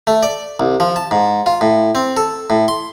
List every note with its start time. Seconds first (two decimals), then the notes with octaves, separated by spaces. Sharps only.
0.07 A3
0.23 D5
0.60 C2
0.80 F3
0.96 A5
1.11 G#2
1.46 F4
1.61 A2
1.95 C4
2.17 A4
2.50 A2
2.68 C6